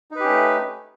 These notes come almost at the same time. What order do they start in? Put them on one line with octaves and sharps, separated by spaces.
D#4 B4 G4 C#4 A3